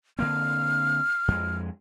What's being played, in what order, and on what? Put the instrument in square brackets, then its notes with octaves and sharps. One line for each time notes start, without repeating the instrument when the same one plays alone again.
[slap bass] D3 A#3 C4 [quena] F6
[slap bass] F2 G#3